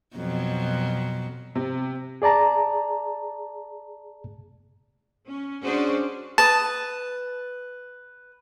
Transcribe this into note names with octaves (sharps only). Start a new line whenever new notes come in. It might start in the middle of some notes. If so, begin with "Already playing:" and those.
F2 B2 F#3
C3
G#4 D5 A5 A#5
C#4
C#4 D4 F#4 G#4 C5 D5
B4 A5 D#6